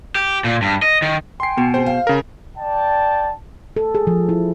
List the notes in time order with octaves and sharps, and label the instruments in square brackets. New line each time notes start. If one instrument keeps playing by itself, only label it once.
[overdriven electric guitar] G4
A#2
G2
D#5
D#3
[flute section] G5 G#5 [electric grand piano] C6 C7
[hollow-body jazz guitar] B2
[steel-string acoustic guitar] G#3 C4 G4 [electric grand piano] C5
[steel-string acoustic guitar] F5
[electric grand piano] C#3 A#4
[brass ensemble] D5 G5 A5
[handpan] A4
G#4
F3
E4